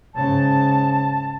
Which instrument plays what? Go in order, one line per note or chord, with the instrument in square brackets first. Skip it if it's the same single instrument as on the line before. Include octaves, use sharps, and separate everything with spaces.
[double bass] G#2 C#3 [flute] A5